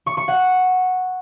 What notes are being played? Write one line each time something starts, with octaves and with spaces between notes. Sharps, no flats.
C#6
C#6
F#5